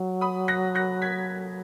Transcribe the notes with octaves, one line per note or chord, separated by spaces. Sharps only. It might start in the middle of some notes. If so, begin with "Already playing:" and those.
Already playing: F#3
B5 D#6
F#6 A#6
F#6 A#6
G#6 B6